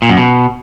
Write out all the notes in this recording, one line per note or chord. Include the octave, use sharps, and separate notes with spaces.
A#2
F#2
B2